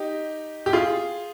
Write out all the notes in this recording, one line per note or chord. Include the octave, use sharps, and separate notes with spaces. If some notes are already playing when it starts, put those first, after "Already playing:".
Already playing: D#4 G4
G4
F4 G#4